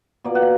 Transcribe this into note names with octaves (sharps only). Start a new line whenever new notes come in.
B2 A#3 D5
F#5
F5